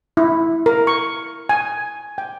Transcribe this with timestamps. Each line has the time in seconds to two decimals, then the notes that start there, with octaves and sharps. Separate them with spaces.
0.17 E4
0.66 A#4
0.87 C#6
1.49 G#5
2.18 G5